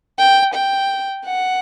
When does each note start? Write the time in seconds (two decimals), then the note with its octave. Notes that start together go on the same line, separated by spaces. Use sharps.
0.18 G5
0.54 G5
1.26 F#5